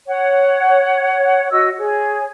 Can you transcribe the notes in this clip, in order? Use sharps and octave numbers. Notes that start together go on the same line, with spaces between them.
C#5 F#5
F#4 D#5 E6
G#4 C#5